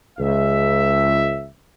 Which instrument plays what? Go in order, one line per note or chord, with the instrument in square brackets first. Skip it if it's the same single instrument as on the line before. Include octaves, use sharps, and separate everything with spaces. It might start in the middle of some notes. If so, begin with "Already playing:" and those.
[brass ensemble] C#2 E5